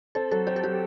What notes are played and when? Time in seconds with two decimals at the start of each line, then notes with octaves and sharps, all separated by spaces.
0.15 C4 A4
0.32 F#3 A4
0.47 C4 G4
0.56 A4
0.63 F#3 G4